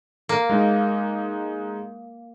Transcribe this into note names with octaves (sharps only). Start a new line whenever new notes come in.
A#3
G#3 D#4